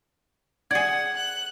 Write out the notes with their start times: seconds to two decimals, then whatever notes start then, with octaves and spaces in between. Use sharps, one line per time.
0.71 G#4 D5 F#5 G#6
1.16 F#6